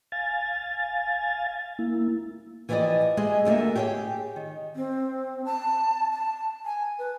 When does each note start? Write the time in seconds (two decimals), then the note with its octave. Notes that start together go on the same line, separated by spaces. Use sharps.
0.12 F5 G#5 A6
1.79 A#3 E4
2.69 E3 F3 E4 G4 D5 D#5
3.17 G#3 G4 G#4 D#5 E5
3.45 D2 D3 A3 A#3 E5
3.75 G4 G#4 C#5 F#5 G5
4.36 D#3
4.76 C4
5.45 A5
6.11 A5
6.65 G#5
6.99 B4